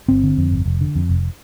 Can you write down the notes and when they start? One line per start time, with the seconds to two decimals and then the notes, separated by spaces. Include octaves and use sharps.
0.08 G1 C4
0.23 D3
0.38 F2
0.51 G1
0.66 F1
0.81 D3
0.96 F2
1.09 F1